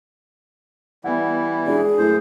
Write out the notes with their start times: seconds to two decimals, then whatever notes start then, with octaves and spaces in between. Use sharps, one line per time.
1.04 E3 G3 B3 E4 F#5
1.66 G#3 D4 F#4 G#4
1.98 F#2 A3 E4 C5